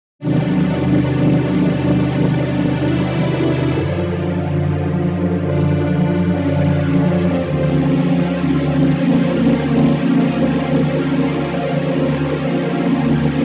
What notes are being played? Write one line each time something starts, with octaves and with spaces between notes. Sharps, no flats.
E2 C3 D#3 F#3 D4
E4
E4
E4
F#2 D3 F3
D4
D4
C#4
D#2 D3 F3 C4
C#4
C4
A#3